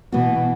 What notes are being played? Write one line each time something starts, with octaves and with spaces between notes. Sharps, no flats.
B2 E3 B3 F#4